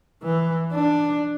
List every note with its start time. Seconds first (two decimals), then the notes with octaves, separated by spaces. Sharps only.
0.23 E3
0.73 D4